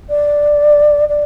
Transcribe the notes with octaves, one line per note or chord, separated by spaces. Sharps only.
D5
D5